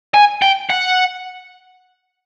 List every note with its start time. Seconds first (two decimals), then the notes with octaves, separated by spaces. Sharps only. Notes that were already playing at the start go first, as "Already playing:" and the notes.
0.14 G#5
0.42 G5
0.70 F#5